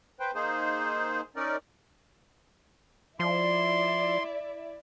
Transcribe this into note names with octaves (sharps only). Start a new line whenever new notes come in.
B4 C5 G5
A#3 D#4 G#4 C5
C#4 D#4 A#4 D5
F3 E4 D5 E5 C6